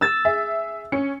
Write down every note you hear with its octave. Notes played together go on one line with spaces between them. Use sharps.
E6 A6
G#4 E5
C#4 C#7